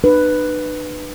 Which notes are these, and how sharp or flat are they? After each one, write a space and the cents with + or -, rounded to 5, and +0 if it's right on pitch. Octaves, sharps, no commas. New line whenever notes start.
D4 +45 B4 +0